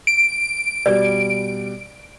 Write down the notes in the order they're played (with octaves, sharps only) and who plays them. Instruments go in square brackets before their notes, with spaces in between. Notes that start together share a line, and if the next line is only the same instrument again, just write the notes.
[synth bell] D7
[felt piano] B2 G3 [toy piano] D5